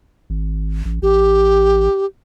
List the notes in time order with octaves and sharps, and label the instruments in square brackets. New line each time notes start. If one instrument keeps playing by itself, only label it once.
[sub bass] G#1
A1
[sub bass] A1 [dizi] G4